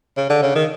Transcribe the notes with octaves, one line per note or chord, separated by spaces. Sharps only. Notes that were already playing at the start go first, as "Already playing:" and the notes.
C#3
D3
C#3
D#3